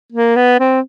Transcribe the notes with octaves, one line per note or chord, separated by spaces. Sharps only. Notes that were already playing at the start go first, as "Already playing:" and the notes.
A#3
B3
C4